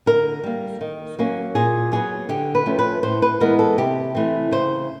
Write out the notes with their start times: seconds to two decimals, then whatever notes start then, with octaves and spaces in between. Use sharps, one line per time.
0.06 D3 A#4
0.44 G3 A#3
0.81 D#3
1.18 F#3 A#3 C#4
1.55 A#2 G#4
1.92 F#3 B3 G#4
2.29 D3 G4
2.55 B4
2.66 F3 A3 C#4
2.79 B4
3.03 A2 C5
3.22 B4
3.40 E3 G#3 B3 A#4
3.59 A4
3.78 C3 G4
4.15 E3 A3 C4
4.51 C#3 C5